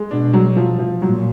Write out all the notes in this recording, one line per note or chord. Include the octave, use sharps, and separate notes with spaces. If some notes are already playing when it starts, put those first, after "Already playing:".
Already playing: G#3
B2 D4
F#3
F3
F3
A#2 F#3